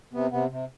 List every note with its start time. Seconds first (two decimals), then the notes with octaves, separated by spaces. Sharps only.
0.13 C3 B3
0.31 C3 B3
0.50 C3